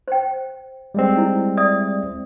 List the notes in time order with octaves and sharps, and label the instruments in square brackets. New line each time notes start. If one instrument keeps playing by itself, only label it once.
[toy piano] C5 G5
[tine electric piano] G3 G#3 C4
[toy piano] E4
D5 E5 D#6